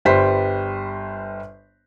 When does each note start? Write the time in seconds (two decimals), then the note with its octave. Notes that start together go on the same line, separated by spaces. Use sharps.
0.05 G1 G3 B4 C5 B6